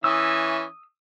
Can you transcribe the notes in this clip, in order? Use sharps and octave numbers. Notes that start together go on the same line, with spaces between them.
E3 C#4 E5 D#6 E6